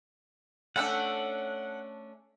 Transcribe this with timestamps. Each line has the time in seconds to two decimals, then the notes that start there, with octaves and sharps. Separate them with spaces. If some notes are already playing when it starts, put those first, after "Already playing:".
0.76 A3 C#4 D4 F#5 E6 F#6